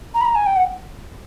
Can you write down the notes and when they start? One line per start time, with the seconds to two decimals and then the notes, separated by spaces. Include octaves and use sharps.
0.14 A#5
0.21 B5
0.25 A#5
0.35 G#5
0.46 G5
0.56 F#5